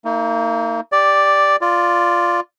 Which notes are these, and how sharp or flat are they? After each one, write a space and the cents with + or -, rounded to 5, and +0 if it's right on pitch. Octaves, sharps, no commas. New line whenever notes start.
A#3 -35 D#4 +30
G4 +10 D5 +0
F4 +0 D5 +0